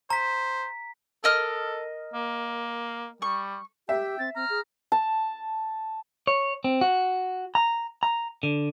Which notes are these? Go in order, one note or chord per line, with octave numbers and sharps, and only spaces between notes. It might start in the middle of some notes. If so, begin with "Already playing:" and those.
C5 A#5 B6
A4 A#4 D#5 F6
A#3
G3 C#6
G4 E5 G5
C4 A6
C4 A#5 F6
G#4
A5
C#5
C4
F#4
A#5
A#5
D3